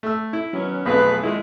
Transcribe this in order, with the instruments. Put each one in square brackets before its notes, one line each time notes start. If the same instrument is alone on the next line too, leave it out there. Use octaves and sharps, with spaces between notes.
[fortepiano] A3 E6
E4
[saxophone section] D#3 B3 C#4 [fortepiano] F#3
[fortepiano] B1 F2 A3 [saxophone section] F#3 G#4 B4
[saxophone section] A#2 D#3 G#3 [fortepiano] E4